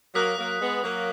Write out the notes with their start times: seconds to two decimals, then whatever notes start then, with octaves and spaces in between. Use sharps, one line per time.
0.15 F#3 A#3 D#6 F#6 B6
0.38 F#3 A#3
0.61 G#3 B3
0.83 F#3 A#3